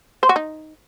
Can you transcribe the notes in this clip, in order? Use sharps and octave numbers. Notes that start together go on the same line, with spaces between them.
C5
F#4
D#4